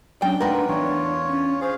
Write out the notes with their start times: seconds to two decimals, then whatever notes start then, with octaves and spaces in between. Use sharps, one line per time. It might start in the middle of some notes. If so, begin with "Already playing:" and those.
0.22 F#3 C#4 D4 G5
0.40 A3 D#4 F4 A#4 B4 F#5
0.68 E2 E3 D4 F4 C#5
1.27 C#4
1.61 C#4 G#4 C5 F5